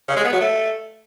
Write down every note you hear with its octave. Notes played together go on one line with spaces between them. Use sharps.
C#3
G#3
B3
F#3
A3